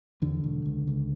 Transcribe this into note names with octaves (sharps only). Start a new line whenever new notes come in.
E2 D3
E1
C#2
C#2